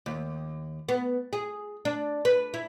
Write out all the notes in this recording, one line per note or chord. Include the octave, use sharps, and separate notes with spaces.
D#2
B3
G#4
D4
B4
E4